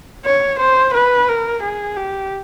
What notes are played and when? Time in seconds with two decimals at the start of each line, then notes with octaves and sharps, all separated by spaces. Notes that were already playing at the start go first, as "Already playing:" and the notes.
0.25 C#5
0.60 C5
0.94 B4
1.28 A#4
1.63 G#4
1.97 G4